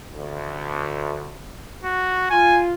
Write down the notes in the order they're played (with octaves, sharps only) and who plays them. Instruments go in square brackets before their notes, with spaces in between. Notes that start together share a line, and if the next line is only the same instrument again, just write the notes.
[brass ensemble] D2
[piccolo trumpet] F#4
[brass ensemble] F4 [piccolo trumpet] G#5